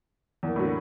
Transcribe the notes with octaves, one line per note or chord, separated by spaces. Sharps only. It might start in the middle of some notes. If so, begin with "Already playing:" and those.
E2 A#3
A2 D3 F#3